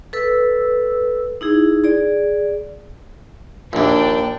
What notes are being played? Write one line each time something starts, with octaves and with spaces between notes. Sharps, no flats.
A4 B4 E6
D#4 E4 G#4
G#4 D5
A#1 D#2 D4 G5